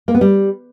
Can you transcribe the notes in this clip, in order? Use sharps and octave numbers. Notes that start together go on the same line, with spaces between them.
A#3
B3
G3